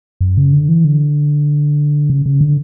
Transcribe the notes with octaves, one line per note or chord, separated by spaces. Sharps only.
F#2
C#3
D3
E3
D3
C#3
C#3
D3